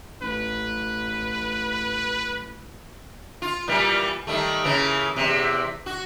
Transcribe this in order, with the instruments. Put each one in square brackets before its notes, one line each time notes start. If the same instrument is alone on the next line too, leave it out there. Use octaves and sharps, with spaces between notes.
[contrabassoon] A1 [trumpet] B4
[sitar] F4
A#2 E3 G3
D#3 G3 A3
C#3 E3 A#3
E2 G2 C3
F#4